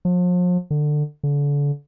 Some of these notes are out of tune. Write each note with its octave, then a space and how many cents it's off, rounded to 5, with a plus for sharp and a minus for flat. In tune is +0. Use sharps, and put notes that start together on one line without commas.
F3 +40
D3 +20
D3 -35